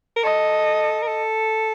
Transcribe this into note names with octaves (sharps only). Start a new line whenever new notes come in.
A#4
A4 D#5
A#4
A4